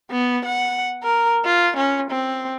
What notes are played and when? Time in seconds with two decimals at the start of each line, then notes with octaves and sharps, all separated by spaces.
0.11 B3
0.45 F#5
1.04 A#4
1.45 F4
1.77 C#4
2.11 C4